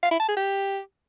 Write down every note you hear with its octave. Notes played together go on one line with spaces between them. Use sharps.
F5
E4
A5
G#4
G4